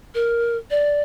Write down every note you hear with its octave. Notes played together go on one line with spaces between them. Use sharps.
A#4
D5